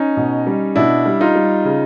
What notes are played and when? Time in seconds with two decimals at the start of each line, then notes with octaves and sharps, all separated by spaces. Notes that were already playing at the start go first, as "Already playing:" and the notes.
Already playing: C#4 D#4
0.17 B2
0.47 G3
0.76 B2 D4 E4
1.06 G3
1.21 D#4 F4
1.35 G3
1.65 C#3